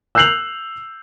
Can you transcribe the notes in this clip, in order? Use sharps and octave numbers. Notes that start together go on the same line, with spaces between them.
E6 F#6 G6 C7 F7 F#7